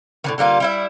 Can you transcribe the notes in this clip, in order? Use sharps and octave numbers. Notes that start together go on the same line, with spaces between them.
A2 D3 D#3
D3 G3 A#3 F4
G3 E4 E5